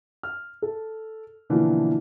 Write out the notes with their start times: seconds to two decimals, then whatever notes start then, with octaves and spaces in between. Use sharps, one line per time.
0.23 F6
0.62 A4
1.50 B2 D3 E3 F3 A#3